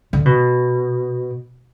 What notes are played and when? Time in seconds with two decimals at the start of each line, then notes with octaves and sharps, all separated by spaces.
0.13 D3
0.25 B2